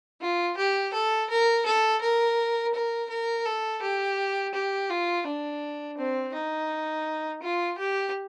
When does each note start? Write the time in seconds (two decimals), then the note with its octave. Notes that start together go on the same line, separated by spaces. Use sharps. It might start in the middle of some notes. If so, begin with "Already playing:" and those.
0.21 F4
0.57 G4
0.93 A4
1.30 A#4
1.66 A4
2.01 A#4
2.74 A#4
3.10 A#4
3.45 A4
3.82 G4
4.54 G4
4.90 F4
5.26 D4
5.97 C4
6.34 D#4
7.42 F4
7.78 G4